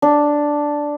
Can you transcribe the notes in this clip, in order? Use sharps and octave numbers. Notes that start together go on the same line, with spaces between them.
D4